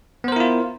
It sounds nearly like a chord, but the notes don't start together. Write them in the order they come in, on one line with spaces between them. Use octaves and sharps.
B3 C5 A#4 E4 F4